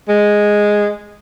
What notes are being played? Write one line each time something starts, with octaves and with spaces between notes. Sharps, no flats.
G#3